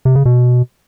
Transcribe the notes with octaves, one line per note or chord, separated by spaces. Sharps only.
C3
C#3
B2